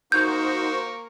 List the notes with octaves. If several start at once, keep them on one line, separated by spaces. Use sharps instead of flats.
A#3 D#4 F#4 A#4 C5 C#6 G6